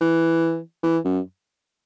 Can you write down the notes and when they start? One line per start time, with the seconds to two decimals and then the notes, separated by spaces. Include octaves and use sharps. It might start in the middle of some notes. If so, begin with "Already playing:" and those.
0.01 E3
0.83 E3
1.05 F#2